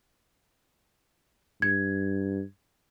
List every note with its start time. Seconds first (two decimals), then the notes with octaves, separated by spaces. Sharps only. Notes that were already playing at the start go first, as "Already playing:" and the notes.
1.62 G2 G#6